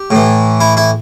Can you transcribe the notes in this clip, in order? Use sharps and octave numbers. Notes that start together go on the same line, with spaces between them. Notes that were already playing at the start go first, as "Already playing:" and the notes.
Already playing: G4
A2 E3
E4
E4